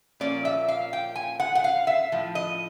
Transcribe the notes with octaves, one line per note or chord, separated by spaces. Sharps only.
A#2 F3 A#3 C#4 D5
E5
F5
G5
G#5
F#5
F#5
F5
E5
A2 F3
D#5